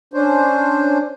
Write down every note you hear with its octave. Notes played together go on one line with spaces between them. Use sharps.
C#4 D4 C5